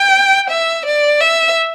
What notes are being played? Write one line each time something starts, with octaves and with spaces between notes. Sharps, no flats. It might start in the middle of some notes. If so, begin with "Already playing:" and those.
Already playing: G5
E5
D5
E5